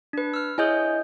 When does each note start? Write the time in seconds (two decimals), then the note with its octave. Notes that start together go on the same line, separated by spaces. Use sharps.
0.13 D4 B4
0.34 E6 F6
0.58 E4 G#4 C#5 D#5 G#5 G6